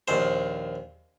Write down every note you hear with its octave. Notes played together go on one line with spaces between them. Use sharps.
A#1 D#2 C5